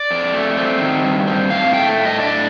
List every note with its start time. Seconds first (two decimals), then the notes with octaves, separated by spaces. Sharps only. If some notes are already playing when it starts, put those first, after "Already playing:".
Already playing: D5
0.11 F2
0.34 A3
0.57 C4
0.81 D#3
1.04 G2
1.27 C4
1.50 A2 F5
1.74 A3 G5
1.97 A2
2.05 D#5
2.20 D4 D5